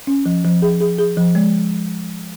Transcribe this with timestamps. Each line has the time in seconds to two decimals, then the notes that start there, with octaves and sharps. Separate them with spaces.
0.07 C#4
0.26 F3
0.44 F3
0.62 G#4
0.81 G#4
0.99 G#4
1.17 F3
1.35 G#3